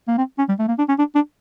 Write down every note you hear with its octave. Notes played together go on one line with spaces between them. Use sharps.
A#3
C4
C#4
G3
A3
A#3
D4
C#4
D4
D4